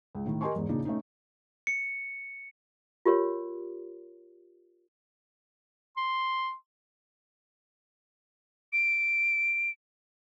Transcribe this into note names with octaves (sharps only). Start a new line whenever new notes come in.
C#2
A2 D#3
G4 A#4 D#5 G#5 C6 C#6
E2 G#2
A#2 C#3 D4 D#4
A3 C#4 D#4
C#7
F4 G4 A#4 C#5
C6
D7